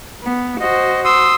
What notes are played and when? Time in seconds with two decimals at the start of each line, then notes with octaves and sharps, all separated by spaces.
0.23 B3
0.60 F#4 C5 D#5
1.05 C6 D#6 E6